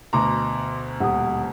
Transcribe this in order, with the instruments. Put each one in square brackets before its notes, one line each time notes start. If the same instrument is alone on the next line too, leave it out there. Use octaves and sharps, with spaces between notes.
[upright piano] D2 B2 A#5 [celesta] C6 D6
[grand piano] D#1 [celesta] F#5 D#6